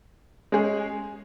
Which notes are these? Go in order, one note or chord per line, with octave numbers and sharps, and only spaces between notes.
G#3 C#4 G#4